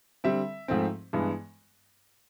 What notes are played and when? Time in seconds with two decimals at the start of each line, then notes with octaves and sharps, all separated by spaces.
0.24 D3 G3 C4 E5
0.68 G#2 F3 A3 C4
1.13 G2 E3 G#3 B3